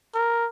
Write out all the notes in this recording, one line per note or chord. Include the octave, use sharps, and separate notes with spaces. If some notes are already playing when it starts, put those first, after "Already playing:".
A#4